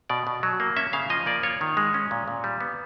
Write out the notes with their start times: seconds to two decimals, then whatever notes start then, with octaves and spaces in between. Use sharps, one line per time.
0.10 B2 D5
0.27 B2
0.43 F#3
0.60 A#3
0.77 C#4 E5
0.93 C#3 F5
1.10 F3 D#5
1.26 A#3 D5
1.43 F4 C#5
1.61 D#3
1.77 G#3
1.94 C#4
2.11 A#2
2.28 A#2
2.44 G3
2.61 B3